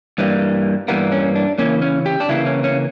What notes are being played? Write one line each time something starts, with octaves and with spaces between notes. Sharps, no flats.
G2 E3 G3 A#3
G2 E3 G3 A#3 B3
C#4
D4
C#3 E3 A#3 C#4
C#4
G4
D4
C#3 E3 A#3 E4
C#4
C#4